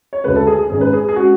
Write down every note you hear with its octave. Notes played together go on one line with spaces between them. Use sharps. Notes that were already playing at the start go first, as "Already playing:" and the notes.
C#5
D2 C#3 G#3 B4
A4
G#4
G#4
G#1 G#2 G#3 C#4 G#4
B4
G#4
G#4
G#3 C#4 F#4